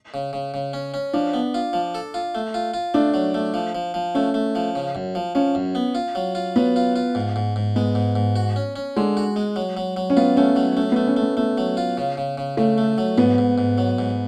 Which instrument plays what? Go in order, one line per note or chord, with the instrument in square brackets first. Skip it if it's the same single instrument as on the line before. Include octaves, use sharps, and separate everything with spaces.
[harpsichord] C#3
C#3
C#3
C#4
C#4
[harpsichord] F3 [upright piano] D4
[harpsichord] B3
F4
F3
A4
F4
A3
F4
F4
[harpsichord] A3 [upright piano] D4
[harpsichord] F#3
A3
F3
F3
F3
[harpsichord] A3 [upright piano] C#4
[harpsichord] A3
F3
C#3
F#2
F3
[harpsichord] F3 [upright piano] C#4
[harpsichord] F#2
B3
F4
F#3
F4
[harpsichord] F#3 [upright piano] B3
[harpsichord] F4
F4
G#2
G#2
G#2
[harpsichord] G#3 [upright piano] B3
[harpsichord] G#2
G#2
F#4
C#4
C#4
[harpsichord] D3 [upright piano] G#3
[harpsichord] F#4
G#3
F#3
F#3
F#3
[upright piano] C#4
[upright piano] B3 [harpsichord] F4
[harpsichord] A3 [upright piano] C#4
[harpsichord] F#3
[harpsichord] A3 [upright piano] C#4
[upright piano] B3
[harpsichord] A3
[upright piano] C#4
[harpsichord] A3
[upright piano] B3
[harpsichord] A3 [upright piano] B3
[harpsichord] F#3
F4
C#3
C#3
C#3
[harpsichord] C#3 [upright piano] A3
[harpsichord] A3
F#3
[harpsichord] G#2 [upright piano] B3
[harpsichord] G#2
G#2
F#3
G#2